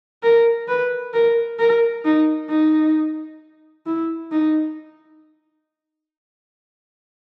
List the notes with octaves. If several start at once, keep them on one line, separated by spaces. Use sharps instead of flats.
A#4
B4
A#4
A#4
D#4
D#4
E4
D#4